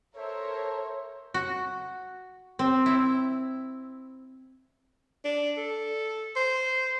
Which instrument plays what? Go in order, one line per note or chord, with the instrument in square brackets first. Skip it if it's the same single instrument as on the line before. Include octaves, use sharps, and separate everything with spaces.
[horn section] A4 C5 E5 [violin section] A#4 C#5
[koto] F#4
C4
E4
[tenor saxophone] D4
A4
C5